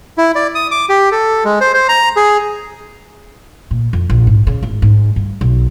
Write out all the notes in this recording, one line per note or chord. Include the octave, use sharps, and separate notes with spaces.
E4
D5
D#6
D6
G4
A4
G#3
C5
C5
A#5
G#4
A#2
F2
A#1
G#2
C#3
G#1
G#2
G2
B1